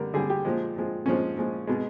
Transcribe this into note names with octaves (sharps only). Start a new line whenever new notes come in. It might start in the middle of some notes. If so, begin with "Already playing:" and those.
Already playing: D3 G3 A#4
D3 G3 G#4
G4
A#2 F3 G#3
A#2 F3 G#3
A#2 F3 G#3 C#4
A#2 F3 G#3
B2 G#3